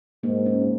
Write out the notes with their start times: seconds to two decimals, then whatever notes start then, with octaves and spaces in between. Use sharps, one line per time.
0.23 G#2 A#3
0.46 C#4